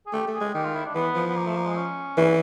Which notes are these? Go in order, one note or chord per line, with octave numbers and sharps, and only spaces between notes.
G#4
A3 G4
A3
G#4
G#3
D#3 G4
F4
E4
D4
E3 B3
F3
B3
A#3
A3
A#3
G#3
C#4
E3